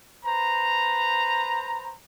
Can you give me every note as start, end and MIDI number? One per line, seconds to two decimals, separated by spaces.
0.25 1.92 71
0.25 1.92 72
0.25 1.92 82